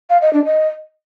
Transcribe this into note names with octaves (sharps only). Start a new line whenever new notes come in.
F5
D#5
D4
D#5